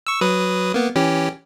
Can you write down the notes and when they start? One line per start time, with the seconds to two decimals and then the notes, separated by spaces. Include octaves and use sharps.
0.07 C#6 E6
0.21 F#3 B4 D#6
0.74 A#3 B3
0.95 E3 C#4 G4